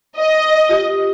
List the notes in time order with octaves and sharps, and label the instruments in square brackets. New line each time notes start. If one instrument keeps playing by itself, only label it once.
[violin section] D#5
[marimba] F4 G4